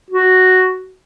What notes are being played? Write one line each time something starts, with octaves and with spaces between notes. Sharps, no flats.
F#4